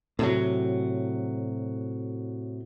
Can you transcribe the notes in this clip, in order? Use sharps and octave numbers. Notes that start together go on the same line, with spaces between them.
A2 C3 F#3